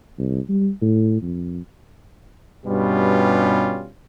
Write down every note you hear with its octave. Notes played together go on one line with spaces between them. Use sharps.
C2
G3
A2
F2
G2 B2 G3 C#4 F4